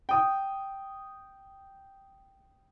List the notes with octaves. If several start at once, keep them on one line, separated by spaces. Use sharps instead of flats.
G5 D#6